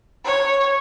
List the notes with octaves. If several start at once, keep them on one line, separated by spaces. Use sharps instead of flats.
C#5